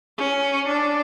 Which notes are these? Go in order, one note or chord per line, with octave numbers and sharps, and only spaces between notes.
C#4
D4